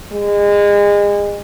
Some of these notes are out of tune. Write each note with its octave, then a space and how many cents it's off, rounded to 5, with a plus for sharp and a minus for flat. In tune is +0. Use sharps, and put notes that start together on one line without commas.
G#3 -30